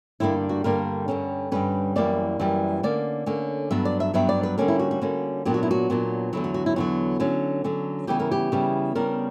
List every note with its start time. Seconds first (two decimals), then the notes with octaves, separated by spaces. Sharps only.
0.20 G2 D3 G3 A#3 D4 E4
0.49 F#4
0.64 G2 D3 G3 A#3 D4 A#4
1.08 G2 D3 G3 C#4
1.52 G2 D3 G3 C#4 B4
1.96 F#2 E3 G3 A#3 D5
2.40 F#2 E3 G3 A#3
2.83 D3 A#3 C#4 D5
3.26 D3 A#3 C#4
3.71 G2 F#3 B3 D4 E5
3.85 D5
4.00 E5
4.13 G2 F#3 B3 D4 E5
4.29 D5
4.43 B4
4.58 D3 G3 A#3 C#4 A#4
4.68 E4
4.79 F#4
4.91 F#4
5.02 D3 G3 A#3 C#4
5.45 A#2 F#3 B3 D4 G4
5.54 F#4
5.63 E4
5.71 F#4
5.90 A#2 F#3 B3 D4
6.33 E2 D3 F#3 E4
6.44 F#4
6.54 F#4
6.66 E4
6.76 E2 D3 F#3 F#4
7.20 D3 F#3 C#4
7.64 D3 F#3 C#4
8.07 C#3 E3 G3 B3 G4
8.20 A#4
8.31 G4
8.52 C#3 E3 G3 B3
8.95 C#3 G3 B3 D4 A#4